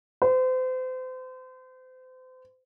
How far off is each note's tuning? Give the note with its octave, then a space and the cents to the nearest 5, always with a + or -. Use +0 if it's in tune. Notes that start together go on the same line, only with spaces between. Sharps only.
C5 -35